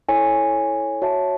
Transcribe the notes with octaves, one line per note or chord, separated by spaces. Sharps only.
E4 A4 C#5 G#5
F#4 C#5 E5 A5